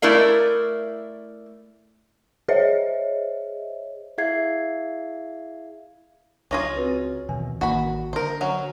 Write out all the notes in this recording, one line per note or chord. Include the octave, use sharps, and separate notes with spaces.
A3 E4 A#4 D5 F5
G#4 C5 C#5 D#5 E5
E4 G#4 E5 F5 G#6 C7
C#2 C#4 F4 G#4 D6 A#6
C4 F#4 B4
D#2 B2 E3 G#5
A1 D#3 A#3 F#4 B5
D3 A#4 C5
F#3 C#4